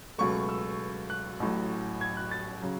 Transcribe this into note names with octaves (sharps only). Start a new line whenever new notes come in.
C#2 B2 F#3 A3 C#6
E6
F#6
A1 A2 F#3
G#6
F#6
A6
C#3 F#3